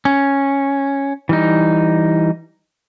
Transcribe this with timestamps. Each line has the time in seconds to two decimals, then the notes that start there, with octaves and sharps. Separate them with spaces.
0.05 C#4
1.29 E3 G3 D#4